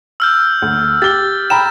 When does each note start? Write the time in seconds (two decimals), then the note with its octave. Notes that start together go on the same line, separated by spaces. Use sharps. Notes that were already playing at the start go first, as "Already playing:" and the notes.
0.20 E6 F6 G6
0.62 D2
1.02 G4 A6 G7
1.50 G5 A#5 B5 E7